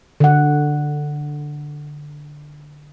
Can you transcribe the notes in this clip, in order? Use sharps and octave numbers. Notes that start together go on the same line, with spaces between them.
D3 F#5